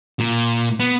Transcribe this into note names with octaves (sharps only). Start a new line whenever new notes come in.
A#2
B3